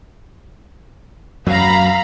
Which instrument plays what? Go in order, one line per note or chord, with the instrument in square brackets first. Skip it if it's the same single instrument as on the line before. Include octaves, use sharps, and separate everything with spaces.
[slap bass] F#2 F#3 [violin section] F5 A#5 B5